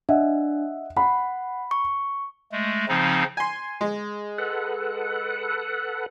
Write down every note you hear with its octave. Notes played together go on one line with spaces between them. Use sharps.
D4 D#5 E5 F#5
F#5 B5
C#6
G#3 A3
C#3 F3 C4 D#4
G#5 C6
G#3
A4 B4 F#5